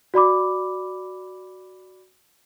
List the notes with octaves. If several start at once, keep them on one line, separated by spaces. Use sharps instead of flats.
F#4 D5 B5 D6